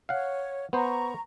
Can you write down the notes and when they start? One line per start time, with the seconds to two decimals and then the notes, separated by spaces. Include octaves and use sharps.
0.09 C#5 F5 F#5
0.73 B3 C5 A#5 C#6